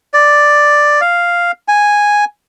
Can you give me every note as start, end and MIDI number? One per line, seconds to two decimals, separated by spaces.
0.14 1.01 74
1.01 1.52 77
1.68 2.25 80